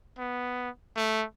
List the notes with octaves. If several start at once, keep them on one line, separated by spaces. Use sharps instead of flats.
B3
A3